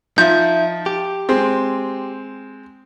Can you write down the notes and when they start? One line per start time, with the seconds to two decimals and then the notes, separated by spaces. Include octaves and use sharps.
0.18 F3 D#4 E5 G6
0.86 G4
1.29 G#3 C4